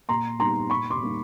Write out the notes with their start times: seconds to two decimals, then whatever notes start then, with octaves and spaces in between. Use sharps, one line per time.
0.09 A#2 A#5 C6
0.39 G3 B3 D#4 A#5 C6
0.70 A#2 B5 C#6
0.91 C6 D6
1.01 G3 A#3 D#4